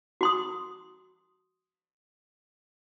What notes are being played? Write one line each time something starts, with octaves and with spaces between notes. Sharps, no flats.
F#4 C6 D#6